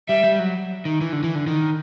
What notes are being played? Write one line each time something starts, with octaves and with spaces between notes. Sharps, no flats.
G3 E5
G3
F#3
D#3
E3
D3
E3
D3
D#3